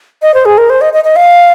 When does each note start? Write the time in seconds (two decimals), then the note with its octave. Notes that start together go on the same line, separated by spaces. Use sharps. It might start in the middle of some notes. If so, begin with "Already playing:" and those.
0.22 D#5
0.34 C5
0.45 G#4
0.58 A#4
0.70 C5
0.81 D#5
0.93 D#5
1.04 D#5
1.16 F5